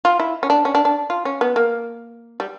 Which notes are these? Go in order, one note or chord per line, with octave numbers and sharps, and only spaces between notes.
F4
E4
C#4
D4
C#4
D4
D4
F4
C#4
B3
A#3
G3